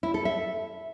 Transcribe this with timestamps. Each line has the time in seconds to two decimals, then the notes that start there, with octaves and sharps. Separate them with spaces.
0.03 E4
0.14 A4
0.25 E5